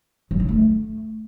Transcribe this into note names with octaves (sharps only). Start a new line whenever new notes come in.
F#3
E4
A3